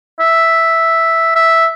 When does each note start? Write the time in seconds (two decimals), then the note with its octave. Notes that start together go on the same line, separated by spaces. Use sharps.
0.20 E5
1.36 E5